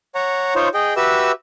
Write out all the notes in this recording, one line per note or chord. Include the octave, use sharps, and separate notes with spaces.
C#5 F#5 A#5
D#4 F4 C5 C#5
G#4 D#5 G5
F#4 G4 B4 E5 E6